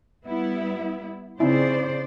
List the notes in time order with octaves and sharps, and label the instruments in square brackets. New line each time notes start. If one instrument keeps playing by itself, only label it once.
[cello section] G3 B3 E4
[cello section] C#3 C5 D5 [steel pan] C4 D#4 E4